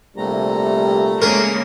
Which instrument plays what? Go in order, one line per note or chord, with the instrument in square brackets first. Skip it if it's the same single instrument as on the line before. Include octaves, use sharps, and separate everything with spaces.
[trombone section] A#1 C3 G3 [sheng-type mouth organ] A3 A#5
[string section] C#3 G#3 A#3 [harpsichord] A#4